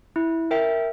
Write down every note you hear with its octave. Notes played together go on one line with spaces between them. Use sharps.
E4
A#4 E5 G5